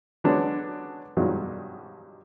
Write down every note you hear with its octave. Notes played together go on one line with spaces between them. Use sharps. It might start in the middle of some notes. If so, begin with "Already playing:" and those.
D3 F#3 G#3 B3 C#4 D4
G2 B2 D#3 F3 F#3 G#3